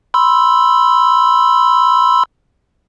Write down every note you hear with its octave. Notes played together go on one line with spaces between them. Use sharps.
B5 C6 E6